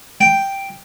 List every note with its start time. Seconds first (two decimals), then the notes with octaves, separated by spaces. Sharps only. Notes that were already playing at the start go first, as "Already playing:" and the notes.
0.21 G5